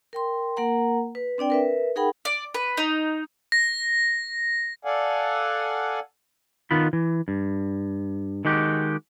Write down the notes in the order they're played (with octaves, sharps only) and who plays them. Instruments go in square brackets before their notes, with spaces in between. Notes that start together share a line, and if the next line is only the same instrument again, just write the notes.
[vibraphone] A#4 G5 C6
A#3 A#4 F#5 A#5
B4
C4 D4 D5 G5
A#4 B4 E5
D#4 G#4 A#4 F#5 G5 B5
[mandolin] D5
B4
D#4
[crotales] A#6
[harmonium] A4 D5 F5 F#5 G#5
[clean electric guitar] D#3 B3 F4 B5
E3
G2
D#3 G#3 F#4 G4